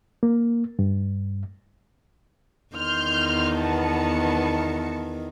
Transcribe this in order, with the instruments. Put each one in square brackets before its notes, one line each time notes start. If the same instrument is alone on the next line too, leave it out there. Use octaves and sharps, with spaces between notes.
[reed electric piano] A#3
G2
[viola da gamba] E2 D#3 [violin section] C6 F6 G6
[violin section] B3 A5 C#7